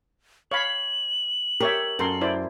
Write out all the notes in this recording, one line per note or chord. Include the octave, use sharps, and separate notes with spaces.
C#5 F5 B5 F#7
G4 A#4 C#5 E5
F#2 A4 A#4 C6
E4 C5 D5